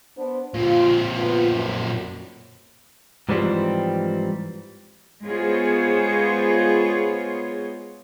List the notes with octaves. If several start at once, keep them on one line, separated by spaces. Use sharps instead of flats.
B3 D4 C5
A#2 C4 F4
B3 F4
F#2
G#2 E3 F3 G3 C4
G#3 B3 F4 G#4 C5 C#5